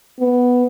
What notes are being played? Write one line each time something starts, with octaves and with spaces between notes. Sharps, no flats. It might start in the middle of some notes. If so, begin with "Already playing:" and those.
B3